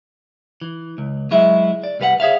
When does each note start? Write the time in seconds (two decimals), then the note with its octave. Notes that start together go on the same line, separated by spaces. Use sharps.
0.61 E3
0.98 C#2
1.31 F#3 G#3 E4 E5
1.84 D5
2.00 C2 G3 B4 F5 F#5
2.20 G#4 C#5 E5 F5